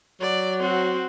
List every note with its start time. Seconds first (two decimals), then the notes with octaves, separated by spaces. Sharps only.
0.21 F#3 D5
0.60 C4 F#4